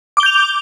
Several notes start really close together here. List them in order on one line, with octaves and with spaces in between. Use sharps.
D6 G7 G6 F7